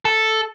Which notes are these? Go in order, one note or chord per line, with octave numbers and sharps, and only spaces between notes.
A4